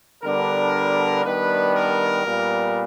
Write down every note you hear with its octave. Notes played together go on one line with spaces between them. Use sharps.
D3 G3 B3 D4 A#4
D#3 G3 B3 D4 B4
A#4
A#2 G3 B3